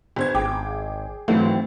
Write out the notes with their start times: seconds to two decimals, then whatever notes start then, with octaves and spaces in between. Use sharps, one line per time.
0.16 G1 C5 G#6
0.35 G#1 G#4 G5 D6
1.28 G#1 E3 F#3 A3 C4 F#4